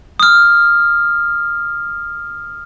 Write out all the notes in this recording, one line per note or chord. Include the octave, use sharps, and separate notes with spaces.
D#6 F6